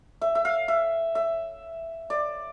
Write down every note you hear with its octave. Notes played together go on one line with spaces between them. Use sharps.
E5
E5
F5
E5
E5
D5